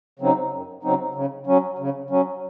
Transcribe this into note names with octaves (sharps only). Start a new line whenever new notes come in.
C#3 F#3 C4 D#4
F#2
C#3 F#3 C4 D#4
C#3
F#3 C#4
C#3
F#3 C#4